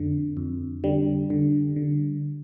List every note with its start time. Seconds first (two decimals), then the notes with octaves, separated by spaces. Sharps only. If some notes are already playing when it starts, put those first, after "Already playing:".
Already playing: F2 D3
0.37 F2
0.84 D3 G3
1.30 D3
1.76 D3